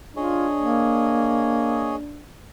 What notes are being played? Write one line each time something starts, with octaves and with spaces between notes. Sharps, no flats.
D4 F4 G#4 C#5 D#5
A#3